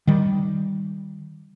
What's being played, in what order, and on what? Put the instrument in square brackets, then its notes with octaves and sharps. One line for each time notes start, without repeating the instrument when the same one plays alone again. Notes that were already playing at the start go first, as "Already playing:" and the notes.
[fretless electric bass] D#3 G3